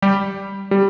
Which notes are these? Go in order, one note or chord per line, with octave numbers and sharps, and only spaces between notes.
G3 G4
G3